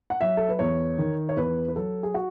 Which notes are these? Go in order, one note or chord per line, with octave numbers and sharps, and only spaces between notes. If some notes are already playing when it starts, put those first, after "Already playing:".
F#5
F#3 E5
A4
B4
E2 C#5
D#3
C#5
E2 B4
B4
F#3 A4
G#4
F#4